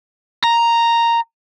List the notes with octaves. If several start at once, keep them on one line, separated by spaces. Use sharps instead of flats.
A#5